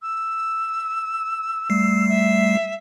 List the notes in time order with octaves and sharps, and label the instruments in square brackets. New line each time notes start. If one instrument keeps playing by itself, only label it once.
[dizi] E6
[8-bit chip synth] G3 A3 C7
[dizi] E5